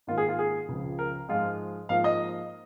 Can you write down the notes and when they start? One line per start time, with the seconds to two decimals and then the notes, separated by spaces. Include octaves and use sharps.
0.07 G#2 D#3 A#3 F4
0.18 G#4
0.29 F4
0.39 G#4
0.69 C#2 C#3 F3
0.99 A#4
1.29 G#2 F3 G#3 F4
1.89 G#2 F3 A#3 F5
2.04 D#5